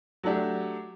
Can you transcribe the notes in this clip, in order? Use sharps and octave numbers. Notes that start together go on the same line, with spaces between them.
F#3 A3 D4 G4